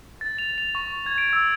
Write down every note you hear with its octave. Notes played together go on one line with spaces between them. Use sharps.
A6
F7
F7
C#6
G#6
D7
E6